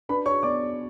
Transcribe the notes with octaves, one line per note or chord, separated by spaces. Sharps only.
D4 B4 B5
C#5 C#6
B3 D5 D6